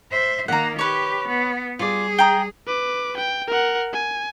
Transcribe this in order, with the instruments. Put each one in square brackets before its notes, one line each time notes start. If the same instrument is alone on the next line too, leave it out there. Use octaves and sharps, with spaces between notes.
[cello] C5 E5
[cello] D#3 A#3 [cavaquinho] F#5 A#5
[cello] G4 [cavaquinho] B4 C#5
[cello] B3
[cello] G3 G#4 [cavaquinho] F4 D5
[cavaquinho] G5 A#5 D#6
[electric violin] B4 D6
G5
A#4 F#5
G#5